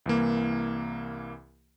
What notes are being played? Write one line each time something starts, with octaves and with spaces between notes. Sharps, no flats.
C2 E3 A#3